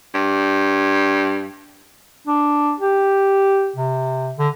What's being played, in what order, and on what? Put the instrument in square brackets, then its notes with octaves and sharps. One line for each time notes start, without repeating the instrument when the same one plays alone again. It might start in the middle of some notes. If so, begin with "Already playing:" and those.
[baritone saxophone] G2
[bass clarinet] D4
G4
C3
D3